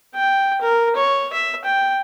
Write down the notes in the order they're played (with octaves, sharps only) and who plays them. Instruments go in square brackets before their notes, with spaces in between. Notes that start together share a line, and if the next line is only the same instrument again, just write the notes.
[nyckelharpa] G5
A#4
C#5
E5
G5